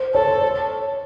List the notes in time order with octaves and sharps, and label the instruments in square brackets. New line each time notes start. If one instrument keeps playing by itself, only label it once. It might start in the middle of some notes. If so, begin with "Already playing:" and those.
Already playing: [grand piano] C5
[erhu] A4 [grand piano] C#5
[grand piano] C5
C#5